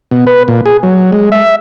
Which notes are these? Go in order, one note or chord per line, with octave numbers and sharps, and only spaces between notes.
B2
B4
A#2
G#4
F#3
G#3
E5